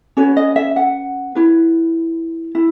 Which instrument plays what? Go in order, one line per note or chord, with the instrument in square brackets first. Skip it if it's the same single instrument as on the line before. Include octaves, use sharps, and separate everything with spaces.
[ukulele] C#4 F#4 B4 C#5
D#5
E5
F#5
E4 B4
E4